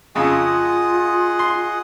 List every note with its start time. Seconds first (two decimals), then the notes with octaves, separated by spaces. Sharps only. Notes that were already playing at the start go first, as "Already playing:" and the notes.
0.15 F2 C#3 F4 G#4 D#5 F#5
1.39 C6